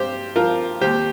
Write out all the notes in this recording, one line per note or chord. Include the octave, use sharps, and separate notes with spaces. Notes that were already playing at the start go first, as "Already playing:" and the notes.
Already playing: G2 G4 C5
F3 F4 A#4
D#2 G4 C5